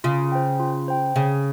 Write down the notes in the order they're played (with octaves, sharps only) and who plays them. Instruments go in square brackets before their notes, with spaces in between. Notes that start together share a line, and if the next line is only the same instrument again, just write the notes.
[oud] C#3 [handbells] F4
[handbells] C5 G5
F4
C5 G5
[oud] C#3 [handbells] G#4